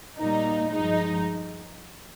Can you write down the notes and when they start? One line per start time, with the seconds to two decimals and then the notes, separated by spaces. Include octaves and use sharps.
0.18 A#2 G3 A#3 D#4
0.71 G2 F3 G#3 D#4